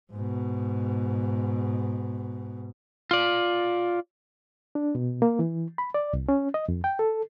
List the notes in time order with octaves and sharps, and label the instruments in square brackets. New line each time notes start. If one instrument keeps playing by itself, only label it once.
[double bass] G#2 B2
[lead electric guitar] F4 D5
[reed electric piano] D4
B2
A#3
E3
B5
D5
C2
C#4
D#5
F2
G5
A4